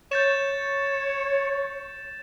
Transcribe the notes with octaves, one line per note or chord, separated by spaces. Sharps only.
C#5 G6 A6 E7